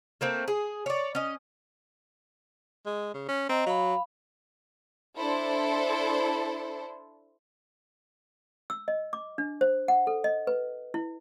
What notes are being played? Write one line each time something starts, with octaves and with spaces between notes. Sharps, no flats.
A3 A#3 C4
G#4
C#5 D5
C#4 D#5
G#3
C#3
C#4
C4 D#5 A#5
F#3 F5 B5
D4 E4 A4 C5
E6
D#5
D6
D4
C5
F#5
A4
D#5
B4
E4